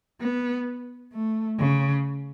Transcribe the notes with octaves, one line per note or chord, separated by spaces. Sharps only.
B3
A3
C#3